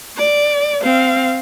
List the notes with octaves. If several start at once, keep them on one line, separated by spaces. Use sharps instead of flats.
D5
C4 F5